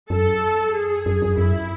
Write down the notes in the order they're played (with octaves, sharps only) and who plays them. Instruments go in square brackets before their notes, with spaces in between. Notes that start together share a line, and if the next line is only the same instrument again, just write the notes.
[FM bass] F#2 [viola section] A4
[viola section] G#4
[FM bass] F#2
F#2
[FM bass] F#2 [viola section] E4